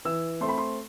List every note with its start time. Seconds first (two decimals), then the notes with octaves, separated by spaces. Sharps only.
0.05 E3 E6
0.41 A3 C4 C6
0.49 B5
0.58 C6